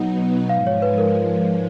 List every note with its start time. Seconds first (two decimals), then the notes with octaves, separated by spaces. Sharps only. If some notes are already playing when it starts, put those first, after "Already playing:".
Already playing: B2 F#3 B3 D#4 F#5
0.49 G#2 F3 G#3 F5
0.67 C#5
0.82 B4
0.98 A#4